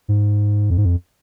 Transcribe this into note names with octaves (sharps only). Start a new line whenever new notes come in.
G#2
F2
G#2
F2